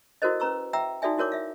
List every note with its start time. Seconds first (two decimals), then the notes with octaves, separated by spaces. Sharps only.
0.22 E4 F#4 A4 A#4 C5 D#5
0.40 C#4 B4 A#5 C#6 E6
0.73 E5 G5 A#5 E6
1.02 D#4 F#4 A4 D5 E5 G#5
1.18 E4 F#4 A#4 C#5 D6
1.32 E5 F5